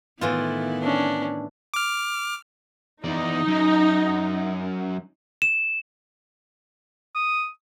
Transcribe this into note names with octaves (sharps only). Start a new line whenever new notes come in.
A2 D#3 E3 B3 E4 F4
C#4 D4
D6 F6
E2 D#4 D5
F#2
E7
D#6